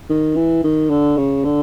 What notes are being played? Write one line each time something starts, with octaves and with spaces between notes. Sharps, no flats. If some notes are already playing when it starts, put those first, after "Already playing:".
D#3
E3
D#3
D3
C#3
D3